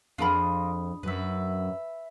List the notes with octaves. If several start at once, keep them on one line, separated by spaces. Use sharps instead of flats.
F2 D4 F4 G#4 A#4 D#5 B5
F#2 B4 E5